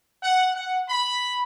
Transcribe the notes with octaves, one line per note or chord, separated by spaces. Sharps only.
F#5
F#5
B5